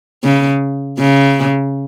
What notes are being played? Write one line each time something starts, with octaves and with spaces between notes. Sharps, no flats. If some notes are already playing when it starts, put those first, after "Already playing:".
C#3
C#3